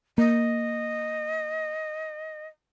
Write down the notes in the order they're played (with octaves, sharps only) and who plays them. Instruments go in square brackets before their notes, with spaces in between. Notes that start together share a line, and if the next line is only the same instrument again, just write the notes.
[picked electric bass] A#3 [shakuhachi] D#5